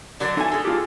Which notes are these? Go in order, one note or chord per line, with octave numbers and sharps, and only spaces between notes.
D3 F#3 A#4 D5
E3 D4 A4 G#5
G#3 G#4
F4 G4